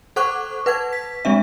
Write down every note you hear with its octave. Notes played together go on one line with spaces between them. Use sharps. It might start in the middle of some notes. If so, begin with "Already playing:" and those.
A4 C5 F#5 C#6 D6 F#6
B4 F#5 G#6
B6
G#3 C4 D4 E5